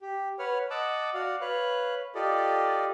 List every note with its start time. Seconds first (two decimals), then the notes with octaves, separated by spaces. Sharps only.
0.01 G4
0.39 B4 C#5 F#5 F6
0.70 D#5 F#5 A5 D6 E6 F#6
1.14 F#4 D5 F5 F#5
1.41 B4 C#5 F5 F#6
2.15 F4 G4 A4 D5 D#5